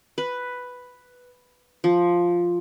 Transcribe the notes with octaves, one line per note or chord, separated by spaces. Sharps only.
B4
F3